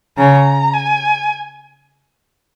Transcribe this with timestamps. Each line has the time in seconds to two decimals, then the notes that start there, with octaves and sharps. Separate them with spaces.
0.18 C#3 A#5
0.74 G#5